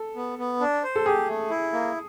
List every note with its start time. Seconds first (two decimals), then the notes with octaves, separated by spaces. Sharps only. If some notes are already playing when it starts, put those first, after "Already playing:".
Already playing: A4
0.15 B3
0.38 B3
0.60 D4
0.83 C5
0.96 A4
1.06 G4 G#4
1.28 A3
1.50 E4
1.73 A#3